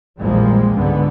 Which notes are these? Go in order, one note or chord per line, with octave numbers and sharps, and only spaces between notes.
A#1 E2 F3 G3 G#3 A#3
C#2 G#2 D3 B3